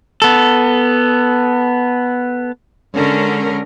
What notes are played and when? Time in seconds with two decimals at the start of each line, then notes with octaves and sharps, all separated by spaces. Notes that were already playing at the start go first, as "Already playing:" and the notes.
0.22 B3 A4
2.94 D3 G#3 C#4 A#4